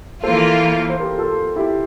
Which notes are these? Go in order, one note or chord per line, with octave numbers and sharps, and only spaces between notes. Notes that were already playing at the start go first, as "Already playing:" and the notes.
E3 A#3 F4 A4 C5
C5
G4 A#4
F4 A4
E4 G4